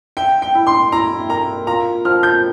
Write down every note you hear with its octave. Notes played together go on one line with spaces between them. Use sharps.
E5 G5
G5
E4
C6
E4 A#5
A#4 A#5
F4 A#5
F3 F6
G6